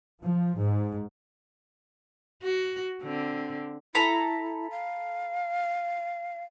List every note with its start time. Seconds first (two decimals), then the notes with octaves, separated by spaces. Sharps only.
0.23 F3
0.59 G#2
2.43 F#4
3.02 D3 C4
3.95 E4 A4 A#5 B5
4.71 F5